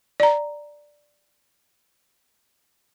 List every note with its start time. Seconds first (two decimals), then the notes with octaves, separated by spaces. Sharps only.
0.20 D5 A#5